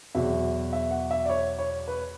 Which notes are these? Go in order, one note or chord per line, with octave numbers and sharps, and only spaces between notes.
E2 B2 F#3 E5
E5
F#5
E5
D5
C#5
C#5
B4